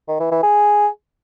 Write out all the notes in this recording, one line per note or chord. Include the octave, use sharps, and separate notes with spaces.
D#3
E3
E3
G#4